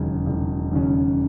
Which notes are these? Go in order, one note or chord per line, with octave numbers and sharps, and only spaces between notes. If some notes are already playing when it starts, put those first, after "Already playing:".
Already playing: E1 D#2 C#3 F#3 C#4
E1
D#2 C#3 F#3 C#4